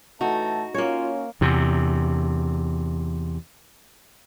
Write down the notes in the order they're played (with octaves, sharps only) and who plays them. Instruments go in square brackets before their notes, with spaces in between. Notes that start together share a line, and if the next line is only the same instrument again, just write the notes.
[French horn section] A2 E3 A3 [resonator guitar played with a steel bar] D#4 F#4 [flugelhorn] A5
[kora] A#3 C#5 [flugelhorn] C#4 [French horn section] F4
[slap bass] E2 C3